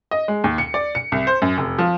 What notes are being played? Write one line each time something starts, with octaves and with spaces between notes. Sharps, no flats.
D#5
G#3
D#2
C#7
D5
C#7
C2
C5
F#2
F1
F3